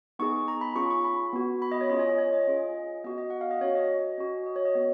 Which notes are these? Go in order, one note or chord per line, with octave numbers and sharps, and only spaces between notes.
B3 D#4 G#4 C#6
A#5
B5
C#4 F4 G#4 C#6
C#6
B5
B3 F#4
B5
D#5
C#5
C#4 F4 G#4 D#5
C#5
D#5
C#5
D#5
C#4 F4 G#4
B3 F#4 D#5
D#5
F#5
F5
D#5
C#4 F#4 C#5
D#5
C#4 F#4
D#5
C#5
D#5
B3 F#4